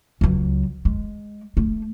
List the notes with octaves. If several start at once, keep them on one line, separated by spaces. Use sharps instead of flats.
C#2 F#3
G#3
A3